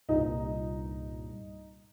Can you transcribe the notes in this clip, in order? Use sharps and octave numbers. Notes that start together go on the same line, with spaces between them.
C2 G2 A#2 D#4